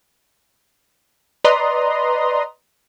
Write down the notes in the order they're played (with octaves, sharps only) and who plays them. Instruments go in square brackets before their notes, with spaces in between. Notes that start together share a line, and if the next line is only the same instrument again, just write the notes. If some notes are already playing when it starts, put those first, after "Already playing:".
[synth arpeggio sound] B4 D5 D#5 A#5 C6 D#6